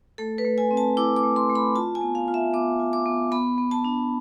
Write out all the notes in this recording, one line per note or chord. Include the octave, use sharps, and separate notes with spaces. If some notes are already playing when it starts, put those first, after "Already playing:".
A3 A4
B4
A3
G#5
C4
A5
E4 D6
D6
A3
C6
A3
B5
F4 A5
G#5
B3
F5
F4
E5
B3 D6
F4
D6
B3
B3 B5
B3
A5
D4